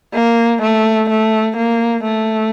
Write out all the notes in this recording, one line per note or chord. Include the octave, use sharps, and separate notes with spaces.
A#3
A3
A3
A#3
A3